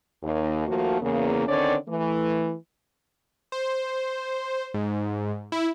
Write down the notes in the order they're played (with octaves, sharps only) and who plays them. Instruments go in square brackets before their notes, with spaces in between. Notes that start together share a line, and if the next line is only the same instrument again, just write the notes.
[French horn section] D#2
D#2 F3 A3 A#3 F#4
E2 C#3 A#3
D3 D#3 C4 C#4 C#5 D5
E3 A3
[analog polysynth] C5
G#2
E4